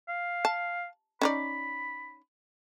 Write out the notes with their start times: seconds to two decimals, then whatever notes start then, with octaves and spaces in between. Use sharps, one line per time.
0.09 F5
0.45 A5
1.21 C#4 D#4 D5 B5